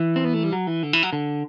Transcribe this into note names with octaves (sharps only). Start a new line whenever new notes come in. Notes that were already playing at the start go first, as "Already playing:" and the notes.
Already playing: E3
C4
B3
A3
G3
F#3
E3
D3
E3
F#3
D3